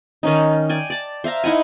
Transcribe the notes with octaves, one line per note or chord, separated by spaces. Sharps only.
D#3 C#4 D#4
D5 G5 G#5
D5 A5
C5 E5 F5 A#5
D#4 E4 F#5 G#5